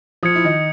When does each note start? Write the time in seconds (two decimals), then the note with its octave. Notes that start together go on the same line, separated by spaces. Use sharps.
0.23 F3 F4 D#6 G#6 C#7
0.35 E4
0.44 D#3 D#4